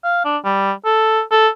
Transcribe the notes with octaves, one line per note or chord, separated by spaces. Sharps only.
F5
D4
G3
A4
A4